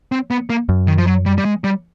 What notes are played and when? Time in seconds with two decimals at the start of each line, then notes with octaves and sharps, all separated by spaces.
0.12 C4
0.31 B3
0.50 A#3
0.69 F#2
0.87 D#3
0.98 F3
1.07 F#3
1.26 G3
1.38 G3
1.45 G#3
1.64 G3